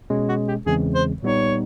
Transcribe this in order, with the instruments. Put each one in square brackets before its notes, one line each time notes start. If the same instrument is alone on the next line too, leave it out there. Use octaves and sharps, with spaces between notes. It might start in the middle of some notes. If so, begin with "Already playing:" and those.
[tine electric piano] B2 G#3 C#4
[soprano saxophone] F#4
G4
[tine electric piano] E2 C#3 E3 G#3 C4 [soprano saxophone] G#4
[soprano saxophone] C5
[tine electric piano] A#2 G3 B3 D#4 [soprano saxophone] C#5